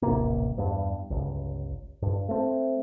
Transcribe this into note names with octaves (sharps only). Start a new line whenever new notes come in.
D#1 A1 C3 A#3
E2 G2
G1 C#2
G2
A3 C4